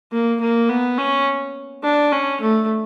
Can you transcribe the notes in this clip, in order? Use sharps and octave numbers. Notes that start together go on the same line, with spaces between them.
A#3
A#3
B3
C#4
D4
C#4
A3